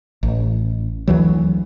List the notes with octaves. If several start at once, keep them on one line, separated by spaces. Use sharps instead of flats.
A1
D2 E3 F#3